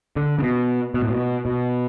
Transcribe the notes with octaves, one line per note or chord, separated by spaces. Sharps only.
D3
C#3
B2
B2
A2
B2
B2